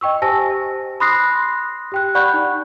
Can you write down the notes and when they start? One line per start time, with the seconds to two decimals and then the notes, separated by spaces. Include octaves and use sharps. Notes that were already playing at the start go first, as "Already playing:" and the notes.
0.01 D#5 G5 C#6 E6
0.22 G4 C5 G#5 A5 E6 A#6
1.00 B5 C6 D#6 F#6 A#6 C7
1.92 G4 G5 F#6
2.15 D5 F#5 B5 C#6 F#6 G6
2.34 D#4